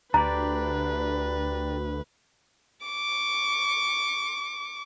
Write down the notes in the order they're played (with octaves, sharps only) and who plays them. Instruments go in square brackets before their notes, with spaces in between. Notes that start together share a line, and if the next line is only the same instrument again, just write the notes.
[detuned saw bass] D2 [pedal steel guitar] D4 G4 D5 [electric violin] B4 [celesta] A#5
[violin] C#6 D6